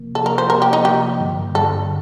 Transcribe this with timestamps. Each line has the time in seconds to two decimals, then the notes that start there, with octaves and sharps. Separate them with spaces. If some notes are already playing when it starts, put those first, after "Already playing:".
Already playing: C3 F3 A#3
0.15 C3 F3 A#3 A4
0.26 A#4
0.38 C5
0.50 C3 F3 A#3 A#4
0.62 G4
0.73 D#4
0.85 C3 F3 A#3 G4
1.20 G2 D3 G3
1.55 G2 D3 G3 A4